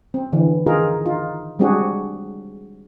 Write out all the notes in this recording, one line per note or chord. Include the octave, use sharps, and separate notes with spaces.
C4
D3 E3
D#3 D#4 F4 G#4 A#4
D#4 F4
G3 G#3 C4 D4 F#4 G#4